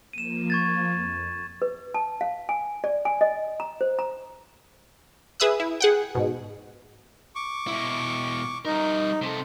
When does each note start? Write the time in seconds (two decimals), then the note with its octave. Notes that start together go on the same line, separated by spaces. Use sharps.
0.13 F3 A#3 D#7 E7
0.50 C#6 G#6 A6
0.91 F2
1.62 B4
1.94 A5
2.21 F5
2.49 G#5
2.84 D5
3.05 G#5
3.21 D#5
3.60 A#5
3.81 C5
3.99 A#5
5.40 G#4 B4 E5 D#6 E6 F#6
5.60 E4
5.81 G#4 F#5 G5
6.15 G#2 B2
7.36 C#6 D6
7.67 B2 E4
8.65 G3 D#4 A#4
9.22 C3 A4